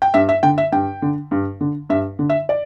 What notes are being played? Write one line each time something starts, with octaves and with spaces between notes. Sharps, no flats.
G5
G2 E5
E5
D3 G5
E5
G2 G5
D3
G2
D3
G2 E5
D3
E5
D5